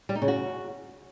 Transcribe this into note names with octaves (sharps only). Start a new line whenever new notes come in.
G3
D#4
C#3
F#4